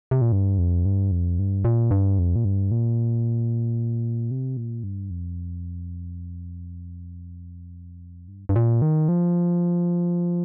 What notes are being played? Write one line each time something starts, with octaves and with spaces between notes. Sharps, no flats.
C3
A#2
G2
F2
G2
F2
G2
A#2
G2
F2
A#2
G2
A#2
C3
A#2
G2
F2
G2
G2
A#2
D#3
F3